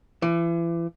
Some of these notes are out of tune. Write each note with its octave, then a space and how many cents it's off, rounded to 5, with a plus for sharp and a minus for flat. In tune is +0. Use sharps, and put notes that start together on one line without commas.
E3 +35